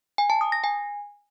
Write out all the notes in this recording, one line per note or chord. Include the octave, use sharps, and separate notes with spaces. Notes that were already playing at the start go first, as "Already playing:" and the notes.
G#5
A5
D#6
A#6
G#5